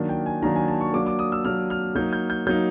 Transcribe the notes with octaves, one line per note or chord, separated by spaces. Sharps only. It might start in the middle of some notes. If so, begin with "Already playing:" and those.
Already playing: D#3 F#3 A#3 D4
G5
G#5
D#3 F#3 A#3 D4 A#5
G#5
A5
C#6
F#3 A#3 D4 D6
D6
D#6
E6
F#3 A#3 D4 F6
F6
F#3 A#3 D#4 G6
G6
G6
F#3 A#3 D#4 G6